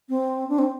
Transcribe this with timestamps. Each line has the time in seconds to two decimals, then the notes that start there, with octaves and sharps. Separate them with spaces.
0.09 C4
0.49 D4
0.59 C4